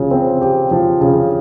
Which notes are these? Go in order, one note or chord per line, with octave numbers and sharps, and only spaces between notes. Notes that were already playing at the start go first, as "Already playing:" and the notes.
Already playing: C#3 F3
C4
G4
F3
C#3